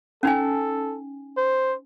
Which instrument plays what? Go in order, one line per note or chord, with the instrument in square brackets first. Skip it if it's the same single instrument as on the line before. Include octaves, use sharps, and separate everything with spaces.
[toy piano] C#4 D#4 G#5 [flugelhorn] A4
[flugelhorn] C5